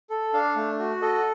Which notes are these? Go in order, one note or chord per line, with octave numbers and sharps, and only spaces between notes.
A4
D4 F5
A3
F#4
A4 D#5